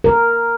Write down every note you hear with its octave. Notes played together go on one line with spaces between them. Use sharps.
A#4